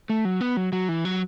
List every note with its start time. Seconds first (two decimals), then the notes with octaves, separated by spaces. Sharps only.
0.10 A3
0.25 F#3
0.41 B3
0.57 F#3
0.73 F#3
0.89 E3
1.05 F#3